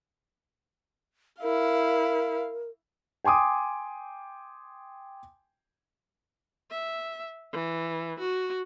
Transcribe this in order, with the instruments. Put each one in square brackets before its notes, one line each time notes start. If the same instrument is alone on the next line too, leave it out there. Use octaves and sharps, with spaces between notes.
[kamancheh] E4 F5 [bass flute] A#4
[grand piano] G5 G#5 C6 D6 D#6
[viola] E5
E3
F#4